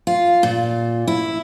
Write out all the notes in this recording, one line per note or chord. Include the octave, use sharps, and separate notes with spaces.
F4
A#2
E4